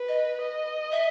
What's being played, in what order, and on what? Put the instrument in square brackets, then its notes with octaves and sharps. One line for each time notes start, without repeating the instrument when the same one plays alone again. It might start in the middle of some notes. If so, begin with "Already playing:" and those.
Already playing: [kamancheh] B4
[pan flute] D#5
[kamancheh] D#5
[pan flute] E5